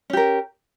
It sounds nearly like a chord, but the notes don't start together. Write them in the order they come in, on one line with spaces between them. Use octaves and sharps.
C#4 G4 A#4